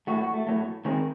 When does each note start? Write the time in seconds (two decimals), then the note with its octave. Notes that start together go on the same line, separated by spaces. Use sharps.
0.07 A2 F#3 A3 F#4
0.20 F#4
0.34 A3
0.47 A2 F#3 A3
0.85 D#3 G#3 C4